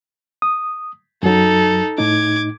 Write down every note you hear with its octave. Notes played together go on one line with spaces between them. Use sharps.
D#6
F#2 F#3 D#4 A4
A2 D#4 D6 G#6